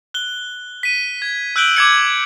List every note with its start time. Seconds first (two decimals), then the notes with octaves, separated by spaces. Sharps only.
0.14 F#6 G7
0.83 B6 D#7
1.22 G#6
1.56 E6 F#6 G6 D7 F#7 G7
1.76 D6 G#6 C#7